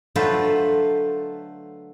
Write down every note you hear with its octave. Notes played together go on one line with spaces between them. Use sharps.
D3 F#3 A3 F4 B4 C5